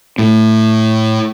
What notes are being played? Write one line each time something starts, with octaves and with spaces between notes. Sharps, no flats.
A2